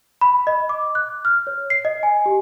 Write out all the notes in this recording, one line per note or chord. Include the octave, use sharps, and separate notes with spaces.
B5
D#5
D6
F#6
F6
C#5
C7
D#5
G#5
G4